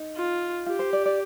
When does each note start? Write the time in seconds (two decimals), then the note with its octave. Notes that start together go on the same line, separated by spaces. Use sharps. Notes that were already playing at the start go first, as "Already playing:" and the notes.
Already playing: D#4
0.16 F4
0.66 F4 G4
0.79 C5
0.93 D5
1.06 D5